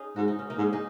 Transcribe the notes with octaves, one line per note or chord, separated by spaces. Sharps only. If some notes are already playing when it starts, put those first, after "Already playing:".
Already playing: C#4 D#4 G#4
G#2 F#4
D#4
C#4
A#3 D#4
G#2
D#4 G#4